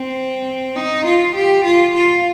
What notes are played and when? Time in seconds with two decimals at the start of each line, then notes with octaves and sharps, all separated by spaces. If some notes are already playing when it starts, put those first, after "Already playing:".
Already playing: C4
0.76 D#4
1.05 F4
1.35 G4
1.65 F4
1.95 F4